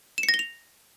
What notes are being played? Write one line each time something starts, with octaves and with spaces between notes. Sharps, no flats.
E7
C#7
A#6
G7
F7